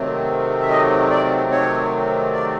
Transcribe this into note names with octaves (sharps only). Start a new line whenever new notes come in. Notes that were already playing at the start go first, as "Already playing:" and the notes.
Already playing: C3 D#3 F#3 A3 C4
E5
D#5
D5
C#5
D5